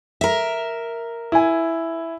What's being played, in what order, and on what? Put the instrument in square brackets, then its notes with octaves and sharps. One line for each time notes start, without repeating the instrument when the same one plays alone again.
[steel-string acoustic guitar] A#4 E5
[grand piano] E4 G#5